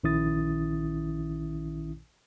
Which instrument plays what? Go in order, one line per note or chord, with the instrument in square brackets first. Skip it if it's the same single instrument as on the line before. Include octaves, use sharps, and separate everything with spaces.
[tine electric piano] A#1 D#3 C#4 E4 D#6 A6